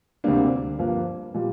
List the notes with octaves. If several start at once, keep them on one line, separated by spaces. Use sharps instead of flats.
D2 C3 G3 A#3 D4
G2 F3 A#3
A#2 G3